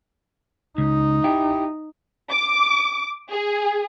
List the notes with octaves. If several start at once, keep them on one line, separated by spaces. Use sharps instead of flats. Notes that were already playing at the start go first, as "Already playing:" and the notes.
C#2 D#4
E4 G4
D6
G#4